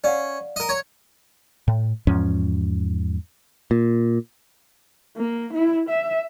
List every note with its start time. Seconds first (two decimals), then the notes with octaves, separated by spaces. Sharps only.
0.04 C#4 D5 F5 F#5
0.56 A#4 D#5
0.69 C#5
1.68 A2
2.07 E2 G#2 F3 C#4
3.71 A#2
5.17 A#3
5.54 E4
5.89 E5